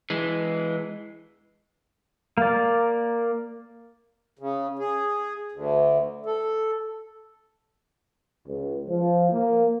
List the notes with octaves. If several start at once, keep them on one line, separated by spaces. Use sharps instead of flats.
E3 G#3
A#3 D5
C#3
G#4
D2
A4
C#2
F3
A#3